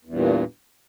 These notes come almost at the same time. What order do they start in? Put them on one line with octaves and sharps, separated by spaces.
E2 G2 A#2